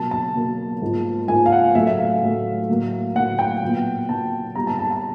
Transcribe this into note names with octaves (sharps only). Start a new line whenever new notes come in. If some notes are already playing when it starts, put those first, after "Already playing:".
Already playing: B2 F#3 A#3 A5
A5
B2 F#3 A#3
G#2 F3 A#3
G#2 F3 A#3 G#5
F5
F#5
A2 F#3 A3 E5
E5
F5
A2 F#3 A3
A2 F#3 A#3
A2 F#3 A#3 F#5
G5
A#2 F#3 B3
A#2 F#3 B3 A5
A#2 G3 B3 A#5
A5
A5
A5